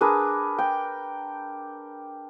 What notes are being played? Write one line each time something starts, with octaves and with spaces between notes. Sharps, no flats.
D4 G#4 A#4 B4
G5